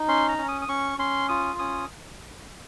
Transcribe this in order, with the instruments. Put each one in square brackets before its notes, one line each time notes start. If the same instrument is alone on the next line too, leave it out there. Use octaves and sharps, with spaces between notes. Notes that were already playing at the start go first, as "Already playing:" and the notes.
Already playing: [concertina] D#4
C#4 C6
A#5
C#4
D#6
D#6
C#4 C#6
C#4 C6
F4 D#6
C#4 D#6